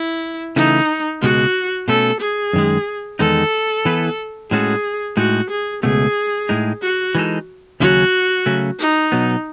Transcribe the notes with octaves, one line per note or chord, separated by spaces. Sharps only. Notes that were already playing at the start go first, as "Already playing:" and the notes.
Already playing: E4
C#3 E3 A3 D#4 E4 A4
C#2 B2 G#3 F#4
B2 A3 C#4 A4
G#4
F#2 D#3 G#3
E2 D#3 G#3 B3 D#4 A4
E3 B3 E4 B4
A2 G#3 C#4 F#4 G#4 A4
A2 G#3 D#4 F#4
G#4
C#2 B2 A3 G#4
A2 G#3 D#4
F#4
E3 G#3 D#4 A4
D#2 C#3 F#3 C#4 F#4
C#3 F#3 A3 C#4
D#4
B2 F#3 B3